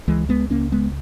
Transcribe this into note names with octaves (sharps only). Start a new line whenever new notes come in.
C#2 E3 G#3
G#3 B3
C#2 A#3 C#4
G#3 B3